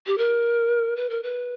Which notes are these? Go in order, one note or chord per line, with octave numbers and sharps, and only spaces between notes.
G4
A#4
B4
A#4
B4